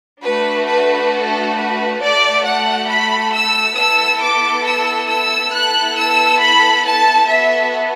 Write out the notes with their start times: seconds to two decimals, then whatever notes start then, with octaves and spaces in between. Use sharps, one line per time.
0.24 A3 D4 F#4 A4 B4
0.68 B4
1.11 A4
1.56 B4
2.00 A3 F#4 A4 D5
2.44 F#5
2.88 B5
3.33 E6
3.76 B3 E4 A4 E6
4.21 D6
4.65 E6
5.08 E6
5.52 B3 E4 A4 F#6
5.97 E6
6.41 B5
6.85 A5
7.28 B3 F#4 A4 E5